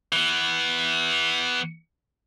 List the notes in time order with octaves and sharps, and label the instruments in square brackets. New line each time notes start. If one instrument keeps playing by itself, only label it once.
[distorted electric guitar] E3 B3